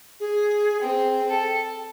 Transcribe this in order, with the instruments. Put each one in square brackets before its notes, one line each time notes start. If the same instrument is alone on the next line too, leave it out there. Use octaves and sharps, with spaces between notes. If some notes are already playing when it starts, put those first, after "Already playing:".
[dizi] G#4
[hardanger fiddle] C4 G#4 [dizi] G5
[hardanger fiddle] A4